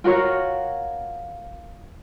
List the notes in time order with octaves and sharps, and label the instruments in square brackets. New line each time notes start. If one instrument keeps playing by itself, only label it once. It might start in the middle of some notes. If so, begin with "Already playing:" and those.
[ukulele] F4 F#4 A#4 C#5